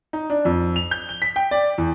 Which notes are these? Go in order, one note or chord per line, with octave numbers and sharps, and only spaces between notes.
D#4
D4
F2
F7
G6
G7
B6
G5
D5
E2